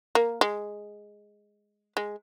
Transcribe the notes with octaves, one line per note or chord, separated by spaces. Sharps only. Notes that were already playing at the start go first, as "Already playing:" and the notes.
A#3
G#3
G#3